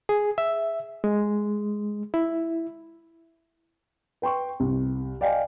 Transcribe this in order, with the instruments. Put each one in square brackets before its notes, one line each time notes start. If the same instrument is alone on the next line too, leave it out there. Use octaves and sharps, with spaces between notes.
[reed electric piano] G#4
E5
G#3
E4
[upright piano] B4 G5 C6 C#6
C2
D5 D#5 F5 G5 G#5